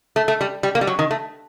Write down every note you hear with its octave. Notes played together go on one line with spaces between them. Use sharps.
A3
A3
G3
G3
A#3
G3
F#3
D#3
A3